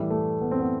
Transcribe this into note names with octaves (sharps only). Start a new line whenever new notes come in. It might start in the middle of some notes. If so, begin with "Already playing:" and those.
Already playing: A2 E3 G3 E4
A3
B3
C4
B3